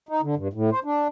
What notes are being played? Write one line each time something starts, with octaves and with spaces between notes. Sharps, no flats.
D#4
D3
G2
A2
C5
D4